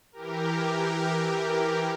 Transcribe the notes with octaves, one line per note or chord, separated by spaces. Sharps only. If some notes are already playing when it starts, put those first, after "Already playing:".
E3 G4 A#4